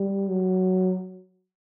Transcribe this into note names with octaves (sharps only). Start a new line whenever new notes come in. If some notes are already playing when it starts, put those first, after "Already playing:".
Already playing: G3
F#3